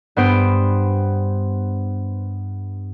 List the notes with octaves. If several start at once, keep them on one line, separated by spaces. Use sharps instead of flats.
G2 B3 C5 D7